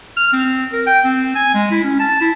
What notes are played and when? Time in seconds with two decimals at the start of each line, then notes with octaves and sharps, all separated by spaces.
0.17 F6
0.33 C4
0.73 A#4
0.87 G5
1.04 C4
1.35 G#5
1.54 G#3
1.71 E4
1.84 C#4
2.00 A5
2.21 E4